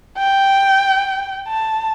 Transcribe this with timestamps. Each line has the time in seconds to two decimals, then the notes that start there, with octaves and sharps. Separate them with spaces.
0.18 G5
1.48 A5